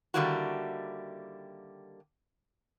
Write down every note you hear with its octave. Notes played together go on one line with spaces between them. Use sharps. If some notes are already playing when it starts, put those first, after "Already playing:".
D3 D#3 G3 A#3 E4 F#4